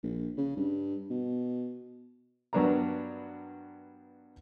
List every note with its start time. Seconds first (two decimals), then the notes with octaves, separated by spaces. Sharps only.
0.03 A#1
0.37 C#3
0.57 G2
1.10 B2
2.53 G2 F#3 B3 D4 A#4 A#5